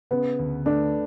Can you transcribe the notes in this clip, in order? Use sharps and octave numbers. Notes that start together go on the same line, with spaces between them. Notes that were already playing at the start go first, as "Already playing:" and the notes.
C#3 B3
D2
A3 D4